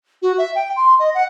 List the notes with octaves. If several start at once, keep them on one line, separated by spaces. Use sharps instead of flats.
F#4
E5
G5
C6
D#5
F#5